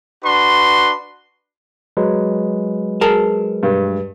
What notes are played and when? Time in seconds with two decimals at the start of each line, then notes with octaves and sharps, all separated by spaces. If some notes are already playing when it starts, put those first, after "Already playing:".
0.25 D4 F#4 B4 C6
1.97 F#3 G#3 B4
3.01 G#4 A#4 A5
3.63 G2